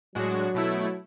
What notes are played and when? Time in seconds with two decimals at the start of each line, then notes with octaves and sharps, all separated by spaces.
0.15 A2 F#3 G#3 D4 F#4
0.55 B2 A3 E4